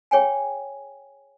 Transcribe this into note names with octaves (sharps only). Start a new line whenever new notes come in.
G#4 C#5 G5 G#5